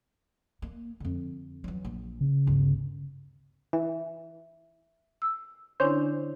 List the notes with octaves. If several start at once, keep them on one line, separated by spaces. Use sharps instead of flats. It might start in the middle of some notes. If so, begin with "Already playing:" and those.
A#3
F2 D3
E3 F#3
A#1
C#3
G1 D2
E3 E5
E6
D3 C#4 D4 E4 C5